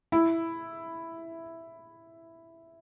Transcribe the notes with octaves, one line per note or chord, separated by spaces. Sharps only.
E4